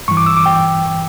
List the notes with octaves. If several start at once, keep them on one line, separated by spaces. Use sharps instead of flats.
G2 E3 C#6
D6
E6
D6
G5